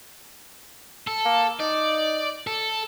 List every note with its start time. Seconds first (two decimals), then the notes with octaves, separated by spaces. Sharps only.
1.07 A4
1.25 A#3
1.59 D#4 D5
2.47 A4